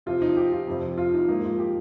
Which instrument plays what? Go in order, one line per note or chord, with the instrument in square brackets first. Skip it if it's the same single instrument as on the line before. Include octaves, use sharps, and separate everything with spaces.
[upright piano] C3 F3 C4 F4
D#4
G4
F4
F2 C3 F3 C4
F4
D#4
G#2 F3 A#3 D#4
F4
G4